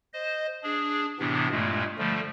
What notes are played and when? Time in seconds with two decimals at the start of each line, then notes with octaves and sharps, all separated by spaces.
0.13 C5 D#5
0.63 D4 G#4
1.19 A2 C3 E3 B3 D4
1.51 G2 A#2 G#3 A3
1.98 D3 F3 G3 A3